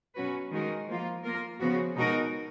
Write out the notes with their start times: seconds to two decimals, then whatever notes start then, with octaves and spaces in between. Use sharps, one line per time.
0.15 B2 F#3 C#4 F#4 B4
0.51 D#3 G#3 D#4 F#4 A#4
0.87 F3 A#3 F4
1.24 A#3 F4 A#4
1.60 C#3 F3 B3 F#4
1.96 B2 G#3 D#4 F#4 A#4